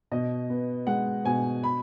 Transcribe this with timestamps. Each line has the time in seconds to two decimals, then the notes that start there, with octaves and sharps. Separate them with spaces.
0.11 B2 D#5
0.50 B3
0.87 G#3 F#5
1.25 B2 G#5
1.64 B5